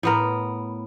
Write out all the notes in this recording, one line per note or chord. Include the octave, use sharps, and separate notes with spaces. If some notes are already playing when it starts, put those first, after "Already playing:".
A2 B3 A#4